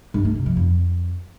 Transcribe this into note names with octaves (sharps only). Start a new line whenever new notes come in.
G2
A3
C3
F3
F2